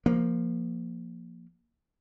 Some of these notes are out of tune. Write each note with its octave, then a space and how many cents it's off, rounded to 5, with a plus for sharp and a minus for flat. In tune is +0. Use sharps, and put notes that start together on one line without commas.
F3 -10 A#3 +0